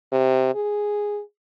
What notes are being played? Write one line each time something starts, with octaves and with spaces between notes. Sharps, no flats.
C3
G#4